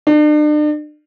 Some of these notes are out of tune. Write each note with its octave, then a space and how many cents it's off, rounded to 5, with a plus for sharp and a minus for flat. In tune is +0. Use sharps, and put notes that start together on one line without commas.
D4 +40